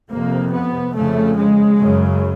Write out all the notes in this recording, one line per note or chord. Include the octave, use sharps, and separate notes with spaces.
F2 C3 A#3
B3
F2 C#3 A3
G#3
F#2 C#3